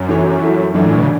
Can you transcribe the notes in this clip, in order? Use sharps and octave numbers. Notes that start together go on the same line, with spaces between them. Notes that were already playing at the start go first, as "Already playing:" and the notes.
Already playing: F#2
E3 A3 C#4 F#4 C#5
F#3 A3 E4
F#2 E3 A3 D4
A2
B2
C#3